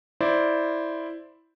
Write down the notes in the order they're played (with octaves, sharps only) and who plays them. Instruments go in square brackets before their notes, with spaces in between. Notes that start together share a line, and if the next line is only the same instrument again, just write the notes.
[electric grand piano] E4 C5 D5